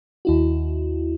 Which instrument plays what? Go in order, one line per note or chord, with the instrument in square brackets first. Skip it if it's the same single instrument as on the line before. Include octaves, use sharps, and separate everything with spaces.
[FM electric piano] D#2 E4 F#4